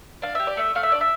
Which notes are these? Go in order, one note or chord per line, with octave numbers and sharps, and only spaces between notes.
D4 F5
G4 E5
D5
A3 E5
A3 F5
E5
D4 D5
E5